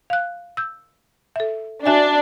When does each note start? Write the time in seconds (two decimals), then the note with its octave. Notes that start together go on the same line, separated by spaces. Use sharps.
0.10 F5 F#6
0.57 E6 G6
1.36 A4 E5
1.86 D4 F#4 E5 G#5